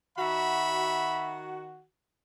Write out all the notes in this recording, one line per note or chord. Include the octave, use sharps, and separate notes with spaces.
D#3 F#4 E5 B5